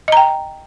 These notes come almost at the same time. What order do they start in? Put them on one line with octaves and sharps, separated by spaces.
D#5 A#5 G5